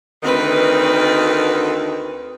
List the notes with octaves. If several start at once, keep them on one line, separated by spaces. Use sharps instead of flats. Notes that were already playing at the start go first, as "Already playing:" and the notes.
D2 D#3 C4 B4